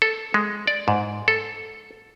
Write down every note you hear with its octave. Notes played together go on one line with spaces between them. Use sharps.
A4
G#3
D5
G#2
A4